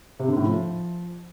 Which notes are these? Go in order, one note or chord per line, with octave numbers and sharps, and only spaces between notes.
C3
D3
A2
F3